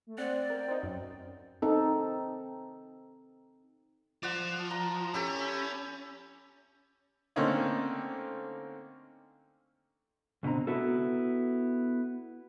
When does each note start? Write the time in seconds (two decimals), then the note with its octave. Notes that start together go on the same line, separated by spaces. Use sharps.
0.07 A3
0.18 C4 D5 F#5
0.50 A#4 G5
0.68 C4 D#4
0.83 F#2
1.62 C4 D#4 A4
4.23 F3 D5 F#5
4.71 A#5
5.14 C#4 E4 G4 A4
7.36 D3 A3 A#3 C4 C#4 D#4
10.43 C#2 B2 D3 C4 A#5
10.67 B3 E4 F#4 A4